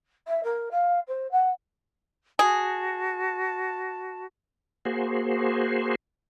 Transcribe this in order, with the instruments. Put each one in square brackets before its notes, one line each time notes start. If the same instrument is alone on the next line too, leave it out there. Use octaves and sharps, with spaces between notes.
[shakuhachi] E5
A#4
F5
C5
F#5
[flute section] F#4 A5 [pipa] G#4
[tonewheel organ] A#3 F#4 G#4 C5